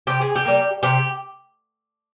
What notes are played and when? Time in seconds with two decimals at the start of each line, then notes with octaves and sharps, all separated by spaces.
0.07 C3 G4
0.21 G#4
0.36 G4
0.45 G3 A#3
0.83 C3 G4